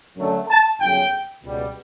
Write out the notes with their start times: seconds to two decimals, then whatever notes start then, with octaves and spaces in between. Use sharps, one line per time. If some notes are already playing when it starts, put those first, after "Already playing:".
0.17 F#2 D3 F#3 A3
0.49 A5
0.80 G1 F#2 C#3 G5
1.43 C#2 B2 G3